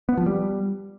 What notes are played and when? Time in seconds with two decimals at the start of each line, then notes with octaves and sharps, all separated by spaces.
0.09 B3
0.18 F3
0.26 G3